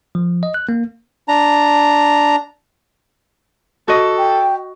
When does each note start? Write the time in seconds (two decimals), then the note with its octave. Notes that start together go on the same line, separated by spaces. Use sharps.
0.15 F3
0.43 D#5
0.54 F#6
0.69 A#3
1.28 D4 A#5
3.88 F#4 A4 D#5
4.18 G5